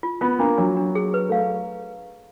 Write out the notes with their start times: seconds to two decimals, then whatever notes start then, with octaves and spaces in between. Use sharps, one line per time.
0.03 F4
0.21 B3 F4
0.39 A#3 D4
0.58 F#3 D4
0.77 D4
0.95 G#4
1.14 B4
1.29 A3 F5